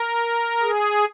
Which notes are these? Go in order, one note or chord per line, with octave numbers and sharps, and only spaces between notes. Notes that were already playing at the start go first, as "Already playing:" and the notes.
Already playing: A#4
G#4